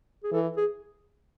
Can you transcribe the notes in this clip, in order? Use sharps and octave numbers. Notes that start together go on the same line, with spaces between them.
G#4
E3 A4
G#4